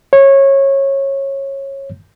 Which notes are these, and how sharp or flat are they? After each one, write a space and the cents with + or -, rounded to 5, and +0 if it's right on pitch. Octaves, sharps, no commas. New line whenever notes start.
C#5 -20